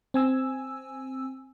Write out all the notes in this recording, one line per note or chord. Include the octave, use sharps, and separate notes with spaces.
C4 G#5 E6